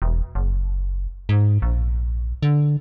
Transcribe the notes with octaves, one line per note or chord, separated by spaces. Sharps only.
E1
F#1
G#2
A#1
D3